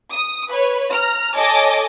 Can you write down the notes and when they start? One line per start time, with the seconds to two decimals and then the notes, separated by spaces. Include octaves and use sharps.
0.12 D#6
0.51 B4 C#5
0.93 A#5 F6
1.36 A4 C#5 D#5 G#5 A5 D6